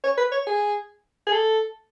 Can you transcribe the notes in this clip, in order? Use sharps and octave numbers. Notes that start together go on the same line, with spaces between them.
C#5
B4
C#5
G#4
G#4
A4